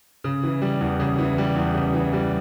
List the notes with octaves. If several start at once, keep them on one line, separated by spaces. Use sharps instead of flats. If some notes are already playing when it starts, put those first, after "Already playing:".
C#3
E3
G3
E2
C#3
E3
G3
E2
C#3
E3
G3